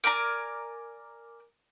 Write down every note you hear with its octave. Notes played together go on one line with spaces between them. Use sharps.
A#4 D5 G#5 A#5